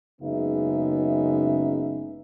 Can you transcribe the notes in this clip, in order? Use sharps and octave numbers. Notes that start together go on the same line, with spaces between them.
F#1 C#3 G#3 B3 D#4 E5